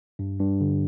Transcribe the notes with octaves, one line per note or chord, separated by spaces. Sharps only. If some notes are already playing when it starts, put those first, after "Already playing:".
G2
G2
D3